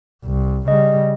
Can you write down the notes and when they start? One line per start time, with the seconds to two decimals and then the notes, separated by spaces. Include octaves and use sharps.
0.25 C2
0.68 C#3 G3 D#5